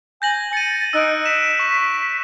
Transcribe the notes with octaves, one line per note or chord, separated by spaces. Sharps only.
G#5 G6 A#6 F#7
A6 C#7 D#7
D#4 E6 F#6 D7
B6 E7
C#6